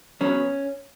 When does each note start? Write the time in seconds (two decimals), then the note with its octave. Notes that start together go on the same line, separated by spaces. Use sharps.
0.21 C#3 F#3 B3 C#4